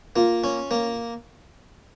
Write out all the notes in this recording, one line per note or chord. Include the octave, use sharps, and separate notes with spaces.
A#3 F4
C#4
A#3